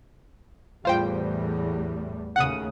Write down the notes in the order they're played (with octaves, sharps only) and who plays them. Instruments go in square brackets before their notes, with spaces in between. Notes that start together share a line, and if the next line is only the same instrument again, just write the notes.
[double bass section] E2 A2 G3 [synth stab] F4 C5 G5
[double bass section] D#2 A2 C#3 [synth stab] F#5 D#6